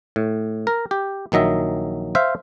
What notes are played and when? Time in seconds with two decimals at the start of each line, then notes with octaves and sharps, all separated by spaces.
0.16 A2
0.67 A#4
0.91 G4
1.32 A#1 D#3 F#3 D#5 E5
2.15 C5 E5 F5